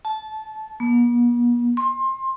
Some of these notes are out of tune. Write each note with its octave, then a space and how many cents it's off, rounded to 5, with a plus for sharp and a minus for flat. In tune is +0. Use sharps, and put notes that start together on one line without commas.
A5 -20
B3 -45
C6 +25